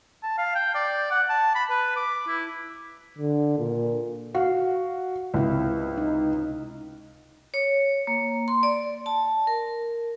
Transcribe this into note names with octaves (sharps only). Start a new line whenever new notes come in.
A5
F5
G5
D5
F#5
A5
B5
B4
D6
E4
D3
A#2
F#4 F5
C#2 C3 E4
D#4
C#5
A#3
C6
D5
A5
A#4